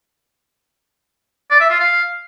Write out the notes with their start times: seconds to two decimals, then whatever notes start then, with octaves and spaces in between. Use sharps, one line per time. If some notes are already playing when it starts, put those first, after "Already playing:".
1.51 D5
1.61 E5
1.70 F4
1.80 F5